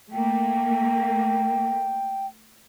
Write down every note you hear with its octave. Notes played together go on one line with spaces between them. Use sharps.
A3 A#3 G5